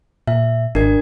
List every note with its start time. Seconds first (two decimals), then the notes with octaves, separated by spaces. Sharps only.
0.27 A#2 E5
0.75 G#1 D4 A#4 G#6